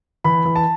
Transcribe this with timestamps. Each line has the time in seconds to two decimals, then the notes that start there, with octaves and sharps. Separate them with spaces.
0.24 E3 B5
0.45 E3
0.56 A5